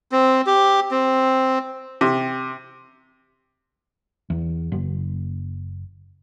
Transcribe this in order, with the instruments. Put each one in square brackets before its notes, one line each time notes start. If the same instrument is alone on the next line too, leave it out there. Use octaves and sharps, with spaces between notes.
[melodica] C4
G4
C4
[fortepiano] C3
[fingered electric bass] E2
F#1